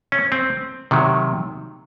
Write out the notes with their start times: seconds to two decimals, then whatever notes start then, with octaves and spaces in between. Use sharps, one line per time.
0.12 C#4
0.32 C4
0.91 C3 D#3 F#3